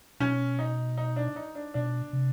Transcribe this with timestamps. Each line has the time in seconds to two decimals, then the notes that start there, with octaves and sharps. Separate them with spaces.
0.20 B2 C#4
0.59 D#4
0.97 D#4
1.16 D4
1.36 D#4
1.55 D4
1.74 B2 D4
2.13 C3